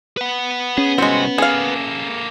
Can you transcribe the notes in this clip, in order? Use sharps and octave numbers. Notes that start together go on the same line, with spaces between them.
B4 F#5
C#4 G#4
C2 G#3 C4 F#4
A#3 G#4 A4 F5